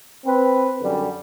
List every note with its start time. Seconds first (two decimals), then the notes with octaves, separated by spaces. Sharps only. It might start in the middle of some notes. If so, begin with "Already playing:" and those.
0.25 C4 B4
0.81 F#2 D3 G3